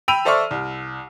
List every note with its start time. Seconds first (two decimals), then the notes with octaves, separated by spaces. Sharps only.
0.08 G5 B5 E6 D7 D#7 F7
0.25 A4 C5 D5 E5 C#6 F6
0.51 C2